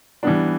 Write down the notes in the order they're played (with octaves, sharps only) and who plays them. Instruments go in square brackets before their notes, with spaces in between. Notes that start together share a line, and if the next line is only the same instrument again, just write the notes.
[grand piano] E3 G3 B3 D4